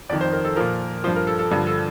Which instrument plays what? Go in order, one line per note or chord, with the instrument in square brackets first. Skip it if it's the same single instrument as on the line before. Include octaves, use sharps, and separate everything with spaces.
[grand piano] F2 D5
D#3
C5
A#4
A4
A#2 F3 A#4
F3 C5
G2
A#4
A4
A4
G2 D3 F3 A4
A4